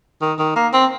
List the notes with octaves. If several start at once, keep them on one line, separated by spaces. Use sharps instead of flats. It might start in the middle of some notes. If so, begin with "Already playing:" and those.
D#3
D#3
A#3
C4